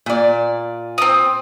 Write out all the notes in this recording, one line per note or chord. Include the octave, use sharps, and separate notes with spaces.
A#2 D5
C4 D#6